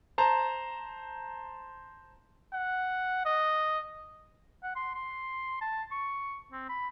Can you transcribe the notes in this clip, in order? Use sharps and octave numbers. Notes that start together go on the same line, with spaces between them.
C5 A5 A#5
F#5
D#5
F#5
C6
C6
A5
C#6
C4
B5